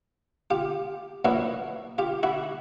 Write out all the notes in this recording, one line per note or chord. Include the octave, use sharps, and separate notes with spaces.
F4 G4
A#2 F#3 B3 E4 F#4
F4 G4
E4 F#4